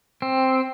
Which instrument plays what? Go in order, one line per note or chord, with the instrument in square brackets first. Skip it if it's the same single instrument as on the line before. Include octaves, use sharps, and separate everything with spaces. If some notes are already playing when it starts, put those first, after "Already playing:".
[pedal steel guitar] C4